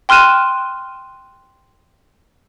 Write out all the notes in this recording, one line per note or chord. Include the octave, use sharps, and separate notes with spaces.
G5 C6 F6 F#6 D#7 E7